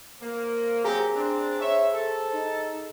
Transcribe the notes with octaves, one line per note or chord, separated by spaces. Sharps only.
A#3 C5
F#3 C4 G4 G#4 A#5
C4 D4
C#5 E5
A4
D#4